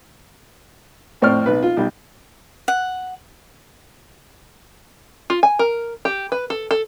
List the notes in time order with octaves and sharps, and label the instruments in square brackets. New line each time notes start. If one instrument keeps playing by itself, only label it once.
[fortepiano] F2 A2 C4 D5 C#6 F6
B1 B4
F4
B1 G3
[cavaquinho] F#5
[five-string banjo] F4
G#5
A#4
G4
B4
A4
A4